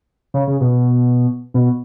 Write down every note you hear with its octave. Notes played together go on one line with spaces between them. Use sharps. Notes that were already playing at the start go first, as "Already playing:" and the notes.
C#3
C#3
B2
B2